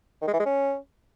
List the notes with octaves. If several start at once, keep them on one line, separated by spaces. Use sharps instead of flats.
D#3
G#3
E3
G#3
C#4